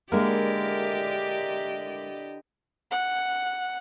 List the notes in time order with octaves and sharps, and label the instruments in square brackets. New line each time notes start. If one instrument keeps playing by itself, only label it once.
[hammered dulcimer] D3 E4 A#4 [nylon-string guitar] G#3 A#3 [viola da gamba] G4 D5 D#5
[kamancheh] F#5